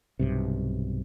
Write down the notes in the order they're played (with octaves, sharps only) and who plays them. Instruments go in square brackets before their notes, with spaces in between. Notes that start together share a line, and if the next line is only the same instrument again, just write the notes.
[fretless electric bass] B1 G2 C3